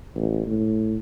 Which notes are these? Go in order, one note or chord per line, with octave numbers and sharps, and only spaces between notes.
A1
A2